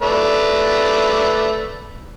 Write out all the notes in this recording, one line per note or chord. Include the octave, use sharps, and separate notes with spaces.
A3 B4 D5